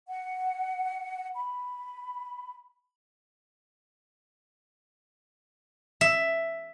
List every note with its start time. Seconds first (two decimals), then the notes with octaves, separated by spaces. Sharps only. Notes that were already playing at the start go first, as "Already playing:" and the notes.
0.08 F#5
1.35 B5
6.01 E5